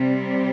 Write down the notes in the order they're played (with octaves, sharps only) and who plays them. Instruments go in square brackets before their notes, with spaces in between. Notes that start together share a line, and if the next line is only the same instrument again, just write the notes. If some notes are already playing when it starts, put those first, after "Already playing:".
Already playing: [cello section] C3 G3 C4